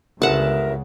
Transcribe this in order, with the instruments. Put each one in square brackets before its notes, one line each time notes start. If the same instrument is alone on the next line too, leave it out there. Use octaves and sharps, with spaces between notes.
[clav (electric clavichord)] G1 [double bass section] C#2 C#3 [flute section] A#4 E5 [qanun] F#5 A5